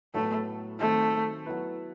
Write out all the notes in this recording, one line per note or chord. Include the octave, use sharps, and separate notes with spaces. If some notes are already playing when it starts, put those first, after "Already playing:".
A2 F#3 A3 B3
D#3 F#3 A3 C4
F#3 B3 E4 B4